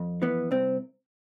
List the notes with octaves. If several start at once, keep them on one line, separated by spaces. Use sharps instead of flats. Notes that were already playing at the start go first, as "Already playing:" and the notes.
Already playing: F2
E3 B3
C2 C4